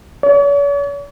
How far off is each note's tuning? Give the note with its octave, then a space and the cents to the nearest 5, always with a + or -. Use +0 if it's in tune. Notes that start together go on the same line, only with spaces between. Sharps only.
C#5 +45